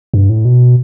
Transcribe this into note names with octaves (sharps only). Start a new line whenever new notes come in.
G2
A2
B2